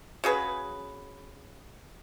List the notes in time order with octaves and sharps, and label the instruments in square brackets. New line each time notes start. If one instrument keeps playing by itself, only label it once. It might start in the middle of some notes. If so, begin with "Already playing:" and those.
[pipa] C#3 F#4 G#4 B4